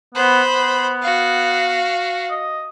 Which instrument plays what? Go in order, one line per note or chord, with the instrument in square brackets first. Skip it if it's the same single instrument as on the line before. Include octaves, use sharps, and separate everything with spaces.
[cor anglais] B3 [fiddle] C5 B5
[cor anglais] B3
[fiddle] F#4 F5
[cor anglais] D#5